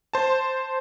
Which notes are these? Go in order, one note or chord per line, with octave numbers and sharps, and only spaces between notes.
C5 A5